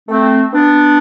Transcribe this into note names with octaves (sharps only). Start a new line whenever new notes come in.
A3 C4
B3 D4